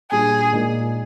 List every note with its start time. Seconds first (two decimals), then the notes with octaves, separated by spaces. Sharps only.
0.11 A#2 G3 D4 G#4
0.52 A#2 G#3 D#4 A#4